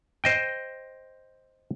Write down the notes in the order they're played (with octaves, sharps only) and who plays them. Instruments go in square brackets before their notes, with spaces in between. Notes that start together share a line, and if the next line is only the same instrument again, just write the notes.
[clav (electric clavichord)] C5 D#5 G5